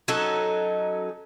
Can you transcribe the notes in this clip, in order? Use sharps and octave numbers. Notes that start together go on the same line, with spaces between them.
F#3 C#4 D#4 A4